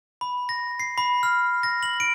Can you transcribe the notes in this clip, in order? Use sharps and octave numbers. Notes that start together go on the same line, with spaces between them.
B5
A#6
C7
B5
F6
A#6
F#7
D7